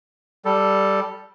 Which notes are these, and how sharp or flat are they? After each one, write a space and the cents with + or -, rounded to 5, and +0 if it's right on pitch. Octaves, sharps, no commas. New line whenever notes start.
G3 +0 A4 +0